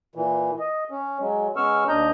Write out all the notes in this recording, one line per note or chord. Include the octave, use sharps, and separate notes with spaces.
A#2 E3
D#5
C#4
F#3 G#3
G#3 B3 C#4 C#6 E6 F6
D#2 D4 D#5 A#5 G6